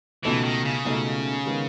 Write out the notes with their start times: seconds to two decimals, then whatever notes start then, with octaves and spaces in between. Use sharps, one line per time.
0.25 C#2 B2 E3 A3 D#4 A4
0.44 D#3
0.65 C#3
0.85 C#2 B2 A3 D#4 A4
1.46 D#3 G#3 B3